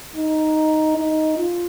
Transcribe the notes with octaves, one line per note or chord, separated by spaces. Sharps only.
D#4
D#4
F4